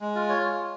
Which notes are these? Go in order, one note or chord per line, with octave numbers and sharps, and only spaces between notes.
G#3
F4
C#5